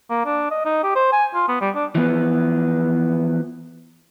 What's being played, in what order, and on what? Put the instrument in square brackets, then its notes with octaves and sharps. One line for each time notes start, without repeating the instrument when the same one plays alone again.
[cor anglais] A#3
D4
D#5
D#4
G4
C5
G#5
F4
B3
G3
D4
[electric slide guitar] E3 F3 B3